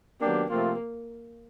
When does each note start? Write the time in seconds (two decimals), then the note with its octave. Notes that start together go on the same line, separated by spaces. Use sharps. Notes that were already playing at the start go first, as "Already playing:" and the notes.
0.20 D#3 F#3 A#3 B3 D4 G4
0.50 C3 F3 A3 A#3 C4 F4